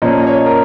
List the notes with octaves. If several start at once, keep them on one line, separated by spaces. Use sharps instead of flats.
A#2 F3 A#3 C#4 D#5
D#5
C#5
A#4